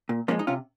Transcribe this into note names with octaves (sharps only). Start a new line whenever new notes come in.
A#2
F3 G#3 A#3 C#4
D#4
C3 C#4 F4